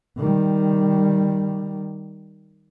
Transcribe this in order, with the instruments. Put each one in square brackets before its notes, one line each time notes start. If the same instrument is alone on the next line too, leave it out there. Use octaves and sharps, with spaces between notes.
[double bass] D#3 G3